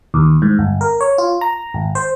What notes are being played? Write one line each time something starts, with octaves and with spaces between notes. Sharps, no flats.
D#2
G#2
G1
A#4
C#5
F4
A#5
G#1
C5